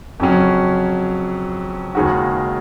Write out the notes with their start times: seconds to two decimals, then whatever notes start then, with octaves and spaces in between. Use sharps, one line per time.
0.20 F2 C#3 F#3 C#4
1.95 D#2 C#3 G#3 D#4 F#4